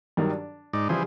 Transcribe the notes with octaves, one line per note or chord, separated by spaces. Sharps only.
G2 D#3 F#3
D4
G#2 D#4 D5
C#3 E3 F3 G3 G#4 C5